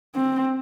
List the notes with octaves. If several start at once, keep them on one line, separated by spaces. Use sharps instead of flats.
C4